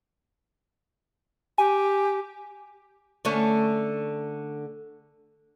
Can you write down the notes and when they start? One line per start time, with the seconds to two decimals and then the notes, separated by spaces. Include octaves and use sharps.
1.58 G4 G#5
3.25 D3 A3 C#4